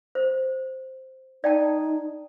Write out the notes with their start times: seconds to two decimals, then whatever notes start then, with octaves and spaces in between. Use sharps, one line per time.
0.15 C5
1.44 D#4 D5 G5 A5